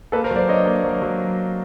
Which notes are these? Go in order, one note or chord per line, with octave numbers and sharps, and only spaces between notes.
A#3 A4 B4
A#4 C5
F#3
C5 D5
D4 C#5 D#5
A#3
F#3
F#3